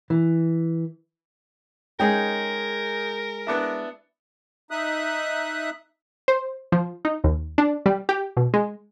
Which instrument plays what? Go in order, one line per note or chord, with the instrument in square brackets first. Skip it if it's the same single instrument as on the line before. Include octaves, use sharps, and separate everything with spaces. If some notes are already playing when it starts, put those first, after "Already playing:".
[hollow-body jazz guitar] E3
[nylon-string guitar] G#3 G5 [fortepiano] C#4 D#4 G#4 [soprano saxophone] A#4
[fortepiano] B3 D4 E4
[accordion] D#4 E5 D#6 F#6
[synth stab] C5
F3
D#4
D#2
D4
G3
G4
B2
G#3